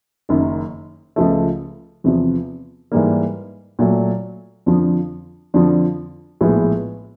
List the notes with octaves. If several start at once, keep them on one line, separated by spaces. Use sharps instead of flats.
F#1 F#2 D#3
C#2 C#3 F3 A3
E2 C3 F3
G#2 E3 G3 A#3
A#2 F#3 A3
F2 D3 F3
F2 D3 F3
A#1 A2 F3 G#3 B3